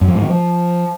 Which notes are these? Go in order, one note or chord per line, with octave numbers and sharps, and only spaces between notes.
F#2
F3
G#2
D#3
F3